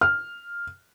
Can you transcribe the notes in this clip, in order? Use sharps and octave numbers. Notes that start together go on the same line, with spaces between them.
F6